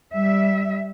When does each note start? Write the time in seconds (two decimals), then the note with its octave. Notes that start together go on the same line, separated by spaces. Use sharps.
0.14 G3 E5